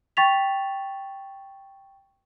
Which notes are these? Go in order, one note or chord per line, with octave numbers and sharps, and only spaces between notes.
G5 C#6 A6 B6 F7